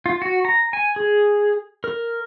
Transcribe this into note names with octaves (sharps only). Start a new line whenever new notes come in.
F4
F#4
A#5
G#5
G#4
A#4